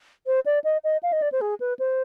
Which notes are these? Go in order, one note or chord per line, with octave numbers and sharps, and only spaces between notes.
C5
D5
D#5
D#5
F5
D#5
D5
C5
G#4
B4
C5